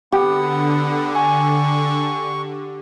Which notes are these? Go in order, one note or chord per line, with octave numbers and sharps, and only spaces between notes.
D3 B3 G4 F#5
G#5 C#6